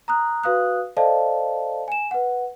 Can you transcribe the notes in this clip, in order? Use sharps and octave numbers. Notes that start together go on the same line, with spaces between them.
A#5 D#6 F#6
F#4 B4 F5 D#6 F#6
A4 C5 D5 D#5 F5 A5
G#5 E7
B4 F#5